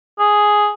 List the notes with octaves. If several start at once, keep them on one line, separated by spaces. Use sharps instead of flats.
G#4